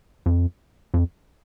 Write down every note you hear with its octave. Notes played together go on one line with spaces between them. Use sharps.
F2
F2